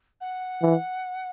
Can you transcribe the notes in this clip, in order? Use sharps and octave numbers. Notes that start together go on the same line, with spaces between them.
F#5
E3